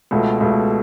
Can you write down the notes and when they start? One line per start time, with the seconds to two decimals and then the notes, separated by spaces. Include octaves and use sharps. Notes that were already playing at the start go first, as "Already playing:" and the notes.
0.11 C#2 B2 A3
0.40 C#2 B2 A3